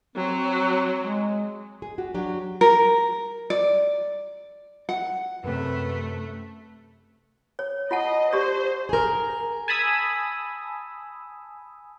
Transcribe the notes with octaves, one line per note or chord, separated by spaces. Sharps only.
F#3 C4
G#3
G#4
F#4 G4
F#3 D4 G4
A#4
D5
F#5
F#2 C3 A3 B4
C#5
F4 D#5 F#5 A5
G4 C5 D5
G#4 A#4
G#5 A5 B5 D#6 E6